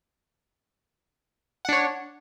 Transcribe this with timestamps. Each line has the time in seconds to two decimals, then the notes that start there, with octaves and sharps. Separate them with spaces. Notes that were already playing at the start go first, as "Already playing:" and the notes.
1.65 F#5
1.69 D4
1.73 C#5